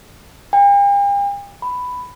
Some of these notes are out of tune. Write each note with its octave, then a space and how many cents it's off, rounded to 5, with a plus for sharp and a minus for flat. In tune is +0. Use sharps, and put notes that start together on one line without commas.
G5 +45
B5 +10